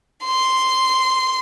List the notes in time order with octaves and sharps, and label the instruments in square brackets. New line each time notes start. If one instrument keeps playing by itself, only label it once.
[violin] C6